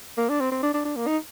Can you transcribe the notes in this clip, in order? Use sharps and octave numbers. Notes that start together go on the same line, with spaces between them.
A#3
D4
C4
C4
D4
D4
D4
A#3
D#4